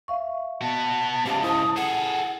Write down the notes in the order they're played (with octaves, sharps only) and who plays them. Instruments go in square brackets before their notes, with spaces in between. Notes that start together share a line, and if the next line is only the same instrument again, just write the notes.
[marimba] E5 F5 C#6
[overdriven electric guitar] B3 F#4 [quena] A5
[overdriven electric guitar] G#2 C#3 [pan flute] G4
[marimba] E4 A#4 C5 [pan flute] D#6
[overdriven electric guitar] G#4 A4 [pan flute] F#5